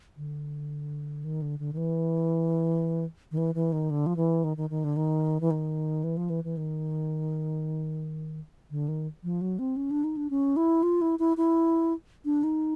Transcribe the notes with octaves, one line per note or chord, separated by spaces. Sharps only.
D3
D#3
D3
D3
D#3
E3
D#3
E3
E3
D#3
D3
F3
E3
D#3
D#3
D#3
D3
D#3
E3
D#3
E3
F3
E3
E3
D#3
D3
D#3
F3
F#3
C4
C#4
D4
D#4
D4
C#4
E4
F4
E4
E4
E4
D4
D#4